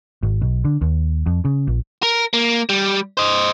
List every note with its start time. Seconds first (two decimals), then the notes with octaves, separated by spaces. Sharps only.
0.23 G#1
0.42 B1
0.64 D3
0.81 D#2
1.26 F2
1.45 C#3
1.67 A#1
2.03 A#4
2.34 A#3
2.69 G3
3.17 C5 D#5